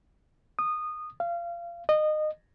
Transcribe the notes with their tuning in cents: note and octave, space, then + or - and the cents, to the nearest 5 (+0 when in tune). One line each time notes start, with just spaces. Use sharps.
D#6 -20
F5 -25
D#5 -25